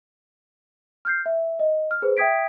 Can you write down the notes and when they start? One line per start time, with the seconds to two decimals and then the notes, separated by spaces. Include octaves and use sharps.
1.05 F6 G6 C7
1.26 E5
1.59 D#5
1.91 F6
2.02 G#4 B4 C5
2.17 E5 G5 D#6 G#6 B6 D7